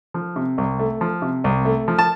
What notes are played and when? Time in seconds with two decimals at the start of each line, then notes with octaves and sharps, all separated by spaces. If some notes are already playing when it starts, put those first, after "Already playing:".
0.14 F3
0.36 C3
0.58 C2
0.79 A3
1.01 F3
1.22 C3
1.44 C2
1.65 A3
1.88 F3
1.99 A5